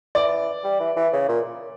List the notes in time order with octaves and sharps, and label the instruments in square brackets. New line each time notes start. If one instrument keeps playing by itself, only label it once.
[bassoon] E3 [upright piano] D5
[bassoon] G3
E3
E3
C#3
A#2